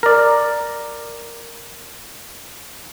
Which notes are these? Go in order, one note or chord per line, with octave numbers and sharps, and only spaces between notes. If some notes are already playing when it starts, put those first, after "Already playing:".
A#4 D5